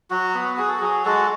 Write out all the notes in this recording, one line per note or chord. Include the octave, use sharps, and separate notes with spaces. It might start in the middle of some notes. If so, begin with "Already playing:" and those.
F#3 F#4
B3
F#4 G#4
A4
F#3 G#4
G#3 F#4 A4